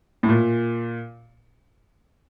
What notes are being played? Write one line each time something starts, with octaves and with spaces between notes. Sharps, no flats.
A2
A#2